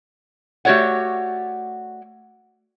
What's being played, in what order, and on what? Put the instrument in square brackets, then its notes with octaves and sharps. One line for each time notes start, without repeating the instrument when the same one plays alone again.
[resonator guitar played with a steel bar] A3 F#4 G4 C#5 D5 F#5